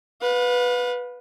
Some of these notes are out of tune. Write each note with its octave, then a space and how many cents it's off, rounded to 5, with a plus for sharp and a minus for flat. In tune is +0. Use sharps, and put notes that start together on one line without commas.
B4 +0 F5 +40